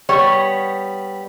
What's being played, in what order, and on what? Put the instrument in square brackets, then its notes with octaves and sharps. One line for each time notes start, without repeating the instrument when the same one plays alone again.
[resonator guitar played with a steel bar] G3 B3 C#5